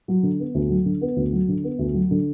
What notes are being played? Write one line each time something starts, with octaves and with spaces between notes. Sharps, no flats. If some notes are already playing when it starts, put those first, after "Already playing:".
F#3
D3
B3
D2
F#3
D3
B3
D2
F#3
D3
B3
D2
F#3
D3